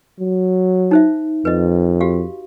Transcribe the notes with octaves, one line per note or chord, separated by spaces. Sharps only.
F#3
D#4 C5 E5
F2 B4 D#5
F#4 G4 F5